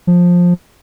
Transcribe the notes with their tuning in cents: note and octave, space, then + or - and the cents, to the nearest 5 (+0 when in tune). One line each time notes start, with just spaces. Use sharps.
F3 +15